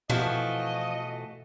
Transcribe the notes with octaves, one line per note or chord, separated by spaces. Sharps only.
B2 E3 F3 A3 F#4 D#5